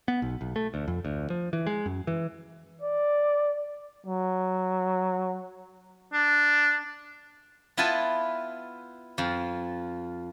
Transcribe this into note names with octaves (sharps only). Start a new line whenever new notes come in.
B3
B1
B1
A3
D2
F2
D2
F3
E3
G#3
F#2
E3
D5
F#3
D4
B3 E4 F4 B4 G#5 A5
F2 F3